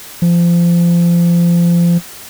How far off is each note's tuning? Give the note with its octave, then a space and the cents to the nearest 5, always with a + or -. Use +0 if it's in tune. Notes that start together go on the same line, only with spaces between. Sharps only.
F3 -25